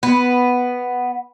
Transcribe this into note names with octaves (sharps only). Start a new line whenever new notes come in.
B3